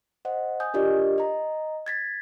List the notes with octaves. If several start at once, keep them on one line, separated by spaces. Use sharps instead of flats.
C5 D#5 F#5
G#5 D#6 G6
D4 F4 G4 A#4 D5 D#5
D#5 A#5
G#6 A6 B6